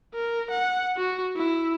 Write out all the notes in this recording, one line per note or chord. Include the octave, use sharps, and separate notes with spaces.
A#4
F#5
F#4
E4